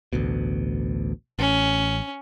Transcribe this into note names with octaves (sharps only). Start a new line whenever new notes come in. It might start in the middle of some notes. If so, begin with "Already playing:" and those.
A1 D2 B2
A1 C#4